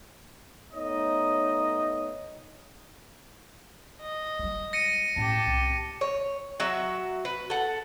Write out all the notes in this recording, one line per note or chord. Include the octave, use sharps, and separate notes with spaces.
A3 B3 D#4 C#5 D#5
D#5
G3 G#3
A#6 C#7 D#7
A2 C#4 G4 A5
C2
C#5
F#3 F#4 E5
B4
A4 F#5